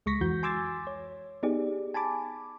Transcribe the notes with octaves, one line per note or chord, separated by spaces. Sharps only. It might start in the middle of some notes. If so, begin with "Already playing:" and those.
C#2 G#3 C#6 A#6 B6
F2 E3 F#4 G6
G#5 C6 D6 E6 G#6 A6
C#5
B3 D#4 G4 G#4 D5
G#5 A5 B5 D6